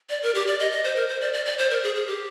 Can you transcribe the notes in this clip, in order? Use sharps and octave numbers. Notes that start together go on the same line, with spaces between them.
D5
A#4
G4
D5
D#5
D#5
C5
A#4
C5
D5
D5
D5
C5
A#4
G#4
G#4
G4